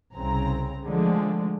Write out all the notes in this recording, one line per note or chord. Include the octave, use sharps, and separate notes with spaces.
C2 C#3 C4 A#5
D3 F3 G#3 A3